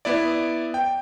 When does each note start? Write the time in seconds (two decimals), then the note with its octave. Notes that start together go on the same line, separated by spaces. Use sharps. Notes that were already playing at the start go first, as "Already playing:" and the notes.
0.05 B3 E4 D5
0.74 G5